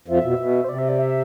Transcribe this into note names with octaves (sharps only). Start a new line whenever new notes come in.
F2 F3 E5
B2
B2
C5
C3 D5
E5
D5
E5